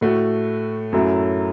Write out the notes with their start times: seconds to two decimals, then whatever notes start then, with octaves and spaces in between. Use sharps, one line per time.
0.01 A2 A3 F#4
0.93 F#2 F#3 A3 E4